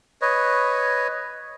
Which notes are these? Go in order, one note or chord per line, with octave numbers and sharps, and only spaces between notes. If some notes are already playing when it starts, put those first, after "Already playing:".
B4 C#5 D#5